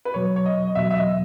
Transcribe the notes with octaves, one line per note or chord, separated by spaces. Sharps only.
B4
E2 B2 F#3 C#5
C#5
D#5
D#5
E2 B2 F#3 E5
E5
D#5